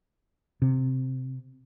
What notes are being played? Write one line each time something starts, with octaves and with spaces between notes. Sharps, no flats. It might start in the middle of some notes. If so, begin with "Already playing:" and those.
C3